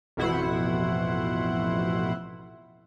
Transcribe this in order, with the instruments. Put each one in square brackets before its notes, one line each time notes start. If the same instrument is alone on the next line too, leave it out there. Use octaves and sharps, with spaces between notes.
[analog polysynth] A1 F2 B2 E4 C5 F#5